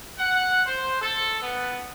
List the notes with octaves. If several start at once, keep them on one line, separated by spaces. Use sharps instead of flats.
F#5
C5
A4
B3